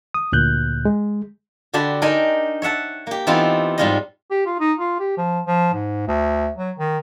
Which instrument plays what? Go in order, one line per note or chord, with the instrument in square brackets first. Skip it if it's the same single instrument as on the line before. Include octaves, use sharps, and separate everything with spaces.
[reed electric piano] D#6
D2 A#2 F#6 G6
G#3
[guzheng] D3 F#4 G4 A5 B5 C6
D4 D#4 A#4 G5 G#5 C6
C#5 E5 F#5 A5
A#3 G4
E3 B3 C4 D#4 F4
G#2 G3 G#3 F4 C5 D#5
[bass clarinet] G4
F4
D#4
F4
G4
F3
F3
G#2
D2
F#3
D#3